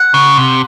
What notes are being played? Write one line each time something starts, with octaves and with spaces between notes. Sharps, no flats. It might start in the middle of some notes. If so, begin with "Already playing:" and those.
Already playing: F#5
C#3
C3